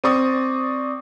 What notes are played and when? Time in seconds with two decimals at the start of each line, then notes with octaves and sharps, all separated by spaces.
0.04 C4 D5 C#6 D#6